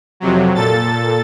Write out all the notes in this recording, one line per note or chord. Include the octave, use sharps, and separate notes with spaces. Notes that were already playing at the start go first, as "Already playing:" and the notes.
F2 C3 F#3
A#2 A4 A6